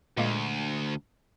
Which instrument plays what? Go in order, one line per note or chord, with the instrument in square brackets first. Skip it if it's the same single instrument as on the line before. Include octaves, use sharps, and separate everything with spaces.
[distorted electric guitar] D2 [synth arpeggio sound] A#2 G#3 A#3